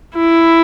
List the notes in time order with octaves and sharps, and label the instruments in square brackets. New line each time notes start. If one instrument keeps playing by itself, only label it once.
[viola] E4